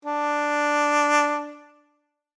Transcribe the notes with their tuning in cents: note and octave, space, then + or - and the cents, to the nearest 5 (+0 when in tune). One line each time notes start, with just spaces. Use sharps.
D4 +0